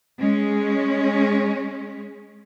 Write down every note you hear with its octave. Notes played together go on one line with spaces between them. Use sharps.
G#3 C#4